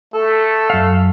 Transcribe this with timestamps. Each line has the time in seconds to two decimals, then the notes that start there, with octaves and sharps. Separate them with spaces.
0.14 A3 A4
0.70 F#2 F5